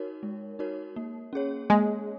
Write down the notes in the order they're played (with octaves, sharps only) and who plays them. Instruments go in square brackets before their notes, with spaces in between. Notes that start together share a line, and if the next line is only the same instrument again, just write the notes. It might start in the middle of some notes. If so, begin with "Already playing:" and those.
Already playing: [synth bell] D#4 F#4 A#4 C#5
G#3
D#4 F#4 A#4 C#5
A#3
C#4 G#4 C#5
[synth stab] G#3 [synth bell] A#3